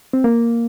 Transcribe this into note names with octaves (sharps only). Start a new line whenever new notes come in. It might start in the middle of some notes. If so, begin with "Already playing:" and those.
C4
A#3